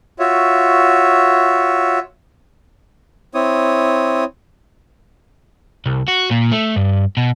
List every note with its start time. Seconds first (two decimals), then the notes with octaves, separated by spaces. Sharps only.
0.19 F4 F#4 C#5 E5
3.35 C4 E4 C#5 D#6
5.86 C2
6.08 F#4
6.31 A#2
6.51 A3
6.76 G2
7.17 B2